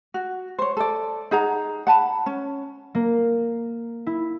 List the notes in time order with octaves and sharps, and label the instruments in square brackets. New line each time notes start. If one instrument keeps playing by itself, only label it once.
[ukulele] F#4
C5 C#5
A4 D5
D#4 G#4 F#5 A#5
F#5 A5 B5
C#4
[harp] A#3
E4